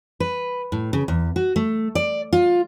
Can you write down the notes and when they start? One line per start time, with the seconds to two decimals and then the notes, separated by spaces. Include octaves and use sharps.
0.20 B4
0.72 A2
0.93 C#3
1.08 E2
1.36 F#4
1.56 A3
1.95 D5
2.33 F4